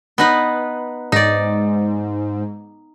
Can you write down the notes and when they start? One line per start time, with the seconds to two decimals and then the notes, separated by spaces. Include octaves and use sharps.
0.18 B3 D#4 B4
1.12 G#2 D#4 D5